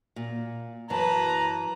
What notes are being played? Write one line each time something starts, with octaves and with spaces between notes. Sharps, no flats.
A#2
F#2 E3 B4 A5 A#5